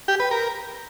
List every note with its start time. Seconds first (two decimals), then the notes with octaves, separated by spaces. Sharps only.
0.08 G4
0.20 B4
0.31 A#4